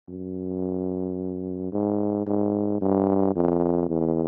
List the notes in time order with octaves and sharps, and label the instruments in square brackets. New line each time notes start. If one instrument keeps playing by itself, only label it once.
[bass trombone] F#2
G#2
G#2
G2
F2
E2